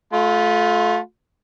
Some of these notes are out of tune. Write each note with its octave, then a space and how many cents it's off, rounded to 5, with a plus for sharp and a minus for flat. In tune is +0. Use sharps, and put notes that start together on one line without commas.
A3 -20 F4 +30 C6 -45